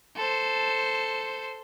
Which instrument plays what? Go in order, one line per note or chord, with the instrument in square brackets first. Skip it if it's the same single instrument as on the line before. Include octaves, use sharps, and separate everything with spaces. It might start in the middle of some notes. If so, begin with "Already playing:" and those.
[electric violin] A4 C5